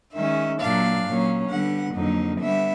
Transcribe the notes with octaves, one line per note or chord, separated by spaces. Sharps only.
D#3 G#3 C#4 E5
A#2 F#3 A#3 D4 F5
A#2 F#3 A#3 C#4
D3 G3 B3 F#5
F2 D3 F#3 A#3 D#4
D3 G3 B3 D4 E5